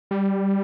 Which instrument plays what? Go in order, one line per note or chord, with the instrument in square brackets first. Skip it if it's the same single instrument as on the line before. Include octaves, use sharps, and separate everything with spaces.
[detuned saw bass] G3